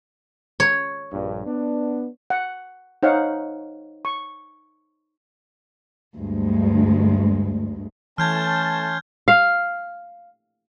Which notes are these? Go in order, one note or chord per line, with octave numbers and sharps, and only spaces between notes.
C#5
A#1 G2
B3 D4
F#5
D#4 C5 C#5 F5 F#5
C#6
D2 G2 G#3
E3 A3 C#4 A5 C6 F6 G6 G#6
F5